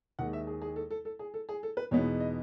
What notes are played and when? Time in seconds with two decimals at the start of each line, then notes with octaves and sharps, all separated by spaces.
0.19 D#2 D#3 G#3 F#5
0.33 E5
0.47 G#4
0.62 G#4
0.76 A4
0.90 A4
1.05 A4
1.19 G#4
1.34 A4
1.49 G#4
1.63 A4
1.77 B4
1.91 E2 B2 G#3 B3 D#4 C#5
2.20 D#5